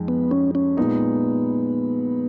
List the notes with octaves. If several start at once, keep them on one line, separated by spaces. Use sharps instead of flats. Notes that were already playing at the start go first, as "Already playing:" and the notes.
Already playing: F2 G#3 D#4
B3
C#4
C#4
A#2 G#3 B3 D#4